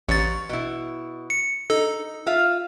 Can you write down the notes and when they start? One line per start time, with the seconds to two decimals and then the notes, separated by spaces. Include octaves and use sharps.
0.09 A1 C#5 A6
0.49 B2 E4
1.30 C#7
1.70 D#4 A4
2.26 F4 E5 F5